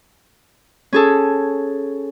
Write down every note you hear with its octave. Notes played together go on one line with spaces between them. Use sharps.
C#4 G#4 A4